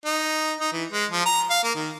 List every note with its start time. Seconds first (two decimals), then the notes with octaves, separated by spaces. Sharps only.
0.05 D#4
0.60 D#4
0.73 E3
0.92 G#3
1.12 F3
1.26 A#5
1.50 F5
1.64 A#3
1.75 D#3